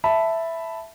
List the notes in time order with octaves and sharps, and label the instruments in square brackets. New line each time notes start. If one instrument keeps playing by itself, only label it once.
[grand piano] E5 A5 B5